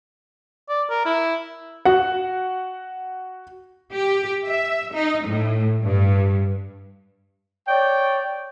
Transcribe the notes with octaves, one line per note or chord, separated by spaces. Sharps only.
D5
A#4
E4
F#4 F#5
G4
E5
D#4
A2
G2
C#5 D5 G5